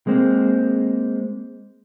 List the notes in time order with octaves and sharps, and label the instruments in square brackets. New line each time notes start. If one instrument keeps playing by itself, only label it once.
[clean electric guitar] G#3 A#3 C4